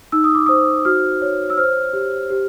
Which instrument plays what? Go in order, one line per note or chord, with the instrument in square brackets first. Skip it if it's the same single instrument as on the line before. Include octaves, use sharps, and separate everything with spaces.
[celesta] D#4 E6
D#6
D6
C5 D#6
F#4 F6
C#5
E6
C5 F6
G4
G4